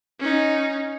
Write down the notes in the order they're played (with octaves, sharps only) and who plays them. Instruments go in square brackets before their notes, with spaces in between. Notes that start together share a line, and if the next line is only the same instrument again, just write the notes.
[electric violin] C#4 D#4